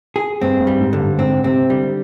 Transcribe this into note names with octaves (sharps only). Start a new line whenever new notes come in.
G#4
G2 C4
G2
G3
G#2
D3
G2
G#2 C4
C3 C4
D3 G3